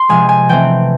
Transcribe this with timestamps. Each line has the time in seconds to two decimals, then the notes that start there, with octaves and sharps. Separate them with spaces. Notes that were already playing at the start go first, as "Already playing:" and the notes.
Already playing: C6
0.09 C3 F3 G#3 G#5
0.29 G#5
0.49 E3 A3 C4 G5